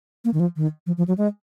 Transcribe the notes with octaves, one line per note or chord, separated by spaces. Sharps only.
A#3
D#3
F3
D#3
F3
F3
F#3
G#3